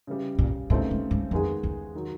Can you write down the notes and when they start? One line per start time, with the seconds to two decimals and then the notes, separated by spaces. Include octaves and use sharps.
0.07 C#3 E3 G3
0.39 A#2
0.70 A#2 C#3 E3 A3 C4 D#4
0.91 G#2
1.11 G#2
1.31 F2 D#3 G#3 B3 D#4 G#4
1.63 E2
1.95 D#3 F#3